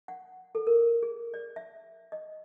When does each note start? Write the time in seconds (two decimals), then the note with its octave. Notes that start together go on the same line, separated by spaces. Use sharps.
0.08 F#5
0.55 A4
0.67 A#4
1.03 G#4
1.34 D5
1.56 E5
2.12 D#5